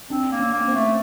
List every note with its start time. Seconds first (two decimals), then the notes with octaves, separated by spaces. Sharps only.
0.10 C4 D4
0.31 A#3
0.39 C#4
0.53 A#3
0.68 C4
0.75 A3